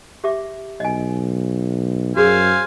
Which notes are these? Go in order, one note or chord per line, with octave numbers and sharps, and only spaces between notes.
G4 E5 D6
B1 D#5 G#5
F#2 F#4 G#4 A#4 C5 F5 G#5